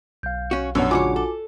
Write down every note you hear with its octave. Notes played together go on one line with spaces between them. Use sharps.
B1 F5 G6
C#4 F#4
A#1 F#2 B2 G3 C#4 D4 C#5 F#5
G#2 C#3 F4 F#4 C#5 G#5 D6
A4